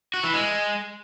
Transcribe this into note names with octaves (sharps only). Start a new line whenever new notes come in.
F#4
E3
G#3